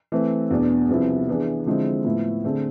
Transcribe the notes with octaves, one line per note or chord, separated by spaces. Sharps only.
E3 A3 C4
E2 B2 B3 D4
C2 C3 F3 B3 E4
E3 B3 D4 G#4
D3 F3 G#3 C4 E4
A2 F3 B3 E4
D3 A3 C4 G#4